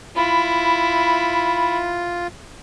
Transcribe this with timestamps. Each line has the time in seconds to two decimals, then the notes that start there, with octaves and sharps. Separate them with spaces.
0.16 E4 F4 B5